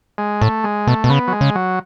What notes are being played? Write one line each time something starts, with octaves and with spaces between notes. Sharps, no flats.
G#3
A2 A3
G#3
B2 A3
B2
C#3 B3
F#3
G#3
C#3
F#3